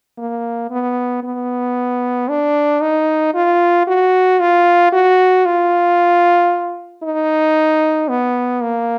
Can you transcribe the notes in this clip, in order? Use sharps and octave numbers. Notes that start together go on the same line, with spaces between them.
A#3
B3
B3
D4
D#4
F4
F#4
F4
F#4
F4
D#4
B3
A#3